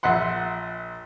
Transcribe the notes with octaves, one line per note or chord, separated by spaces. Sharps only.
A#1 E5 F#5 C6